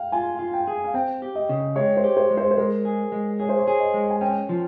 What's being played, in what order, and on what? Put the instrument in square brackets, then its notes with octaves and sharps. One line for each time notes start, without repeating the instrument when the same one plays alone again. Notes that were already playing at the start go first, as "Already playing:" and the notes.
Already playing: [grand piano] F5 G5
[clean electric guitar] F4 [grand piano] G#5
[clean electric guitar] F4
[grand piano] G5
[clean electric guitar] G#4
[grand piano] F5
[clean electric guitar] C4 [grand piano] G5
[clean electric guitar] G4
[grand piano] D#5
[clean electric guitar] C#3
[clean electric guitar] G#3 [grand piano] C#5
[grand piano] C5
[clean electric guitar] G4
[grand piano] C5
[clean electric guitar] G#3
[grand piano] C5
C5
[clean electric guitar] G#3 [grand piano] A#4
[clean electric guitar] G#4
G#3
[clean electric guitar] G#4 [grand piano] C#5
[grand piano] C5
C#5
[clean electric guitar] G#4
[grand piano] D#5
[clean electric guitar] G#3
[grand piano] G#5
[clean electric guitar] C#4 [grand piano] G5
[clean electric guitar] F3